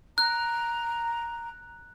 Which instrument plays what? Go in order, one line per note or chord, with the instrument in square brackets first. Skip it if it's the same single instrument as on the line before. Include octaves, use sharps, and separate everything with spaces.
[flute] A#5 [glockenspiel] F#6